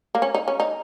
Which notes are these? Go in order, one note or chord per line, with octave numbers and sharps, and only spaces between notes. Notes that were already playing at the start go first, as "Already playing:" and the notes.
A#3
C#4
D#4
C#4
D#4